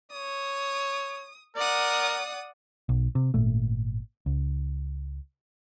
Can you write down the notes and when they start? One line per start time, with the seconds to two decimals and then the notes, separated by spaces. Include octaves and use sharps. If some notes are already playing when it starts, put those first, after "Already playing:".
0.12 C#5 D#6
1.57 A#4 D5 F#5 D#6
2.89 B1
3.15 C3
3.34 G#1 A#2 A3
4.26 C#2